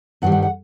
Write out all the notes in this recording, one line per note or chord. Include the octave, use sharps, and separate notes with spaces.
G2 D#3 G3 F#5
F#5
F#5